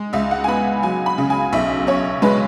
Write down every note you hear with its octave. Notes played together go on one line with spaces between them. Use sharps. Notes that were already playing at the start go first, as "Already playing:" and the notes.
Already playing: G#3
C#2 E5
F#5
G#5
B3 B5
F#3 G#5
B5
C#3
G#5
B1 E5
C#4 C#5
G#3 B4